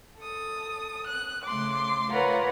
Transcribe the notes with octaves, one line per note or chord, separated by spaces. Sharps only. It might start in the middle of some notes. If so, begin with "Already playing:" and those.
A4 D#6
F#6
C#3 A3 C6 D6
F4 A#4 B4 C#5 F#5 A#5